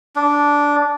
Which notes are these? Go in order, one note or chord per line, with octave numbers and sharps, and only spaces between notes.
D4